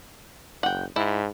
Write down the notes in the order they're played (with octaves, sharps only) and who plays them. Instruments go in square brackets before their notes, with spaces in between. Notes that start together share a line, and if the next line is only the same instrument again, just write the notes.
[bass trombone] F#1 [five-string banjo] F#5 G5
[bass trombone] G#2 [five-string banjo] E4